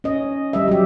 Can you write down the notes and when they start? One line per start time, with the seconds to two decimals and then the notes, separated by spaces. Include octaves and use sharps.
0.04 C#4 D#5
0.53 G3 D#5 E5
0.68 F#3 G4